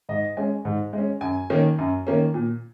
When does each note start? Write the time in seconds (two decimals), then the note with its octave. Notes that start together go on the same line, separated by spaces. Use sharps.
0.09 G#2 D#5
0.37 G#3 C#4 G#5
0.65 G#2
0.93 G#3
0.98 C#4
1.21 F#2 G#5
1.50 D#3 A#3 C#4
1.78 F#2
2.07 D#3 A#3 C#4
2.34 A#2